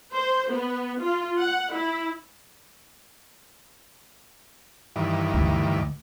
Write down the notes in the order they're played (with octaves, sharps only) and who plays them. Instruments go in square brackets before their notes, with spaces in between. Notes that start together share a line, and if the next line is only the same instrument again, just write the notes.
[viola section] C5
B3
F4
F#5
E4
[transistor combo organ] G2 D#3 E3
[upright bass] D2